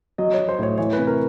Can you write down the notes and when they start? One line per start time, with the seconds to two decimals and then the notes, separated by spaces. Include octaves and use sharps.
0.18 F#3 D#5
0.34 F#3 C#5
0.49 C5
0.59 A2 C#5
0.78 E3 C#5
0.93 C3 B4
1.07 A#4